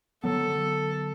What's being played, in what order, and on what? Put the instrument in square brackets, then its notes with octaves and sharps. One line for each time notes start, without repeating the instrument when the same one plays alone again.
[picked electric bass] D3 F#3 B3 [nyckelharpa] A4